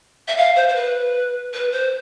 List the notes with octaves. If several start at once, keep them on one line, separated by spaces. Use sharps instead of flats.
E5
F5
C5
C5
B4
B4
C5